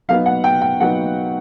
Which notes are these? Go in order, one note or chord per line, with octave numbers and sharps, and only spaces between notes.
F#3 B3 D#4 F5
F#5
G5
G5
F#3 B3 D#4 F#5